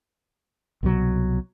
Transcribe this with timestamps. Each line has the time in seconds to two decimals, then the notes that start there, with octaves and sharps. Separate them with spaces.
0.83 C2 B2 F3 F#3